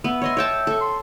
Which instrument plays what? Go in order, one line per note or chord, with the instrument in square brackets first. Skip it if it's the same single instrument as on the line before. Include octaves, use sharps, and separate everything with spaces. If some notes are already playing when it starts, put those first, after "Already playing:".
[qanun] B3 [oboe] E5
[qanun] C#5 D#5 C6 [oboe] E5
[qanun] C#5 G5 A5
A4 C#6
[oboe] C6